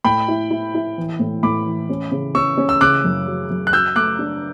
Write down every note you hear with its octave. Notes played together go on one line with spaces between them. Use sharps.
A2 G5 B5
E4
E4
E4
E3
A2
A2 B5 D6
E3
C#4
C#3
C#4 C#6 E6
C#4
E6
C#3 D6 F#6
F#2
F#3
F#2
F#6
F#3 E6 G6
A3 D6 F#6
D4